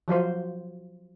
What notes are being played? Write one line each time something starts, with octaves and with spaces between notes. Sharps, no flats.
F3 F#3 F4 C5